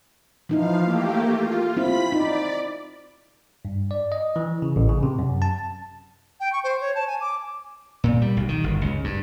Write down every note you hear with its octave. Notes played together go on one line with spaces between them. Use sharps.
E3 F3 D#4 E4 F5
A3 A#3 G4
F4
C4 E4 F4 B5 B6
D#4 D5
G2
D5
D#5
E3
C#3
A1
C#3
C3
F#2
A5
G5
C#6
C5
C#5
A5
G#5
D6
A#2
G3
B1
D#3
G1
C#2
G2